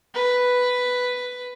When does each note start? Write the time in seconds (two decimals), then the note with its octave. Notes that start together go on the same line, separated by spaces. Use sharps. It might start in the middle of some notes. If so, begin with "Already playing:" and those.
0.14 B4